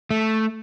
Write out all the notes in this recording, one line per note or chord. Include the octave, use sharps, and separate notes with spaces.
A3